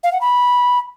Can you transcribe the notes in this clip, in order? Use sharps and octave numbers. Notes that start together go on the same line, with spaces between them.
F5
F#5
B5